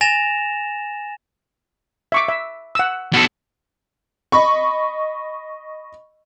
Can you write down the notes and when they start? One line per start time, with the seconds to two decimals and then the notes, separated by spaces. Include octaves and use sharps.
0.01 G#5 A6 A#6 E7 F7
2.12 E5 C#6 D6
2.28 E5
2.75 F#5 E6
3.13 B2 A4
4.32 D#5 B5 C#6